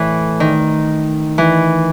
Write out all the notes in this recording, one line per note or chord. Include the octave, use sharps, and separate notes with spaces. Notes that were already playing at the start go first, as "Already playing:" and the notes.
Already playing: A2 E3 A3
D#3
E3